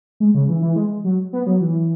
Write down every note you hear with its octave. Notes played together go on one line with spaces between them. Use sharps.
G#3
C#3
E3
E3
G#3
F#3
B3
F#3
E3